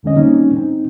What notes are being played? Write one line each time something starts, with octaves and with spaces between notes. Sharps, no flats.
F2 D3 G#3 C#4 D#5
G3 A#3 C4 C#4 D#4
C4 D#4